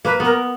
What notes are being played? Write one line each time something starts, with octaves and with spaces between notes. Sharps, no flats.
A#3 B4
B3 A#4